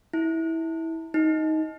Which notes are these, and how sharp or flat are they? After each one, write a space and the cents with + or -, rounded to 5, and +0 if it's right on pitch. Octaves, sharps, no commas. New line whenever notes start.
E4 -20
D#4 +10